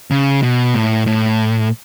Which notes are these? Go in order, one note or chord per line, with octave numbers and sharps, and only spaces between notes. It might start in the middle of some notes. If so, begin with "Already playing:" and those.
C#3
B2
A2
A2